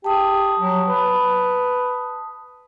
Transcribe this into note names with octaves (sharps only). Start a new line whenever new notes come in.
G4 A5 D#6
F#3
B4